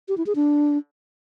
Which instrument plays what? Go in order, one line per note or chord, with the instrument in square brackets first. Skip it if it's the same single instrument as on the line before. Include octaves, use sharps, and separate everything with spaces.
[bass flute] G4
E4
G#4
D4